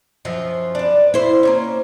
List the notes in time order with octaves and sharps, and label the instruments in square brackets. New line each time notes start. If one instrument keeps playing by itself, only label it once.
[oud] F#2 F3
[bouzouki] D4 B4
[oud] E4 C5
[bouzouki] A#3 B3 C#4